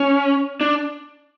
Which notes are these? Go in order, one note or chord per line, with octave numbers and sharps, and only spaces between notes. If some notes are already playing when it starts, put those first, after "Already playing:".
Already playing: C#4
D4